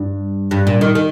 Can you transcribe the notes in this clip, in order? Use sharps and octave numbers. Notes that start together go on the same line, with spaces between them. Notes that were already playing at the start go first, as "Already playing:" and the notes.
Already playing: G2
G2
A#2
D#3
D#3